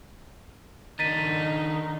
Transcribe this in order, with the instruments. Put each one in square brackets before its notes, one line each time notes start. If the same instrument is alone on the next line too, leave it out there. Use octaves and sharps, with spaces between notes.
[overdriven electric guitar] D#3 D4 [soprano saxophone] D#4 [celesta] A6 B6 D#7